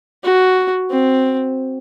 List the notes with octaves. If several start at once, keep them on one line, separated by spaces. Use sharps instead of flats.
F#4
C4